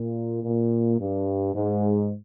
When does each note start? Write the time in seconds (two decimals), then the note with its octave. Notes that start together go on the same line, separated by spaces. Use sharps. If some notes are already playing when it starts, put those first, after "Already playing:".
Already playing: A#2
0.42 A#2
0.98 G2
1.54 G#2